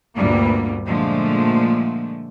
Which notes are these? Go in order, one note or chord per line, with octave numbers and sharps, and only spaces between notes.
D2 G2 A#2 G3 A#3 B3
A#2 D3 F3 G#3 A3